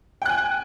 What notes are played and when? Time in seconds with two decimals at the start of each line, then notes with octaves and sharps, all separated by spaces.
0.22 G5
0.26 F#6
0.29 G#5